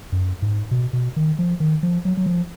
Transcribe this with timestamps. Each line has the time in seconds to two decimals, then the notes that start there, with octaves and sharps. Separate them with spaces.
0.12 F#2
0.42 G#2
0.71 B2
0.93 B2
1.16 D#3
1.39 F3
1.60 D#3
1.83 F3
2.05 F#3
2.17 F#3
2.26 F3